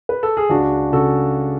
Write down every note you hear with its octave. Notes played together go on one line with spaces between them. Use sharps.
B4
A4
G#4
C#2 D4 F#4
C#3 F#4 A4